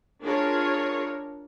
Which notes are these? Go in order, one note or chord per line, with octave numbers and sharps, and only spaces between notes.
D4 F4 G#4 A#4 C#5